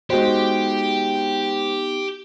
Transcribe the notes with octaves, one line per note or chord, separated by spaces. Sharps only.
G#3 B3 D#4 F#4 G4 C5 G5